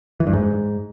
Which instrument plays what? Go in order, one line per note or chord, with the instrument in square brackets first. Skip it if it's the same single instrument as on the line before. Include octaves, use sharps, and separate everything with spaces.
[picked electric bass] E3
G2
G#2